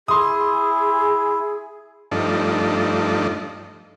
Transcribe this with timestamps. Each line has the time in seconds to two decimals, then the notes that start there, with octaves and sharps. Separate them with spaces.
0.08 E4 G#4 C6 D#6
2.11 G2 F3 A3 D4 D#4